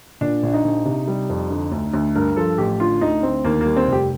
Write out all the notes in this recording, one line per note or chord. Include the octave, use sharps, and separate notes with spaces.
A#2 D4
A#1
D#4
A#1
C3
G3
F2
D3
D2
D2
G2 A#4
F3 A4
A1 G4
D3 F4
D2 D#4
D2 C4
D#2 A#3
G3 A#3
C4
F1
G4